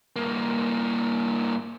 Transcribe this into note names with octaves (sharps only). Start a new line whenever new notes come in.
G2 A#3